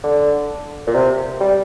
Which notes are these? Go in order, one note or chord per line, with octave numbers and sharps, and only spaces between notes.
D3
A#2
C3
G3